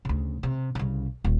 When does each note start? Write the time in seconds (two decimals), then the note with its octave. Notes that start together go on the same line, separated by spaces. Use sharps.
0.05 D2 C#3
0.43 C3
0.75 C2 C#3
1.24 D#1